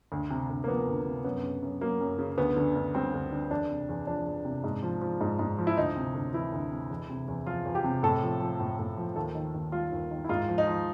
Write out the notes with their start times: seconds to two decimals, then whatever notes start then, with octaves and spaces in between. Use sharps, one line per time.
0.12 D2
0.30 C3
0.50 D2
0.64 A#3
0.68 F3 B3
0.87 D2
1.06 C3
1.24 F#2 B3
1.43 C#3
1.62 F#2
1.81 F#3 A#3
2.00 F#2
2.18 C#3
2.38 D2 B3
2.56 D3
2.75 D2
2.95 G3 C4
3.14 D2
3.32 D3
3.51 E2 D4
3.70 C3
3.89 E2
4.07 F3 D4
4.26 E2
4.45 C3
4.64 G#2
4.83 F3
5.02 F3
5.21 G#2
5.39 G#2
5.59 F3
5.67 E4
5.77 D2 D#4
5.97 C3
6.15 D2
6.33 E3 E4
6.52 D2
6.71 C3
6.90 E2
7.09 C3
7.28 E2
7.46 F3 F4
7.65 E2
7.75 G4
7.84 C3
8.03 A2 A4
8.23 F3
8.41 F3
8.60 A2
8.79 A2
8.98 F3
9.16 D#2 A4
9.35 D#3
9.54 D#2
9.72 G3 F4
9.92 D#2
10.11 D#3
10.24 E4
10.29 G#2 F4
10.49 F3
10.58 D#4
10.67 F3